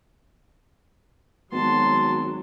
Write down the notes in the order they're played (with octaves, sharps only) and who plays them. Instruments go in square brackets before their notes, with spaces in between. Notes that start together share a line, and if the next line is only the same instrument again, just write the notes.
[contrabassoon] G#1 [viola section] F#3 [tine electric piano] G#3 B3 [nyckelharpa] A5 C6